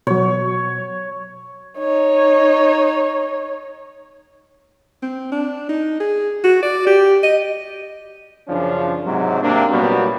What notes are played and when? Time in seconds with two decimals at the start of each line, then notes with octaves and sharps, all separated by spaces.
0.07 B2 F#3 C#5
1.78 D#4 C#5
5.02 C4
5.32 D4
5.69 D#4
6.00 G#4
6.44 F#4
6.63 D5
6.87 G4
7.23 D#5
8.48 F#2 C#3 F3 C#4 D4
9.05 G#2 C3 F#3
9.42 C3 A#3 D4
9.70 A#2 F#3 G3 B3 F#4